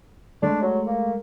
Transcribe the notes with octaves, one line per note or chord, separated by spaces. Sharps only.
G#3 A3 D4
F#3
A#3